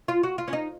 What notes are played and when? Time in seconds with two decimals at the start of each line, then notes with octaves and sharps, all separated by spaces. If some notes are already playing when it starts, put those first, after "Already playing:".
0.08 F4
0.23 F#4
0.38 F4
0.48 C#4
0.53 D#4